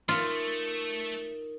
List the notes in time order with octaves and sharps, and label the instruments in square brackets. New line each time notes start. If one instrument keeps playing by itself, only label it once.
[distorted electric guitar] A3 [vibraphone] D#4 A#4 [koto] F4